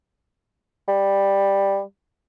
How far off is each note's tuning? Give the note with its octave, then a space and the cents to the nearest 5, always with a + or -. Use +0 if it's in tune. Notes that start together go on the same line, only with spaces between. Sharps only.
G3 +10